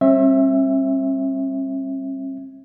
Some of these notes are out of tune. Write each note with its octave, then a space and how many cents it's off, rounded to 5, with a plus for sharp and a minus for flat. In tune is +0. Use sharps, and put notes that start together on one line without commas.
G3 +0 C4 +45 E5 +0